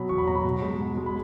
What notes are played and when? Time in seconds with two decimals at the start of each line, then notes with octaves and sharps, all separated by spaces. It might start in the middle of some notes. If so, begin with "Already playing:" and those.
Already playing: B2 F#3 B5
0.09 E2 C#6
0.18 B5
0.26 B2 F#3 A#5
0.35 B5
0.44 B2
0.62 G#3
0.80 B2
0.97 G#3
1.06 B5